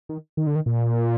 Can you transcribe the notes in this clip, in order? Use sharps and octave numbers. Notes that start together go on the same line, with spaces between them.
D#3
D#3
D3
D#3
A#2